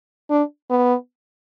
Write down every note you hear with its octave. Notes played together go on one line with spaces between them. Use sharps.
D4
B3